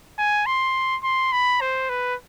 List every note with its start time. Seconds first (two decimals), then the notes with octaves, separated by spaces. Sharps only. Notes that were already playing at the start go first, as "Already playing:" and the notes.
0.18 G#5
0.46 C6
1.03 C6
1.32 B5
1.61 C5
1.89 B4